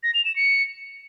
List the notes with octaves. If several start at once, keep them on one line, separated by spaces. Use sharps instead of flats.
A#6
F7
E7
C#7